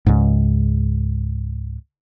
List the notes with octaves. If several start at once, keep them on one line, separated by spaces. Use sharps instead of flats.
C#2 G#2